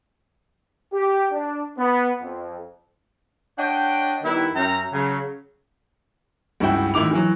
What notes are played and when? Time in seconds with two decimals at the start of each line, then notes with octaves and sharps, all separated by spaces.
0.93 G4
1.32 D4
1.78 B3
2.22 F2
3.58 D4 C#5 D#5 F#5 G5
4.24 D#3 G3 B3 E4
4.54 F#2 C#4 E5 G5 A#5
4.93 C#3 F#3
6.60 C#2 G2 C#4 E4 F#4 G5
6.94 A1 D#3 E4 D6 F7
7.11 E3 F#3